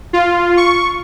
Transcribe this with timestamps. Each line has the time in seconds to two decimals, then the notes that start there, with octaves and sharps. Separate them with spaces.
0.13 F4
0.57 C#6